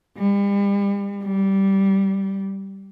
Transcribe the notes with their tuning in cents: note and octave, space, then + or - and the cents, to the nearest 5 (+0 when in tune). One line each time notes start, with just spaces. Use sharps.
G3 +40
G3 -15